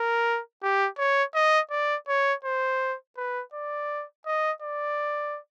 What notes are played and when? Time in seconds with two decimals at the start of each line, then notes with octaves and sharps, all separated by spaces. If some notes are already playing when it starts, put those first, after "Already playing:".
Already playing: A#4
0.63 G4
0.98 C#5
1.35 D#5
1.71 D5
2.08 C#5
2.45 C5
3.17 B4
3.54 D5
4.26 D#5
4.62 D5